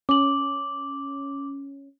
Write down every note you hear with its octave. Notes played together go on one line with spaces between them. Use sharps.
C#4 D6 F#7